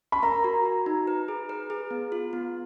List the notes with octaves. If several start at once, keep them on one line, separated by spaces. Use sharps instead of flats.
B5
A#4 A#5
F#4
F#4
D#4
B4
G#4
B4
G#4
B3
F4
B3